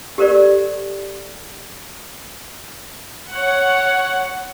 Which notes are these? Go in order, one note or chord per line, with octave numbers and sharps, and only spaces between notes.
G4 A4 A#4 C5 D5
C#5 F#5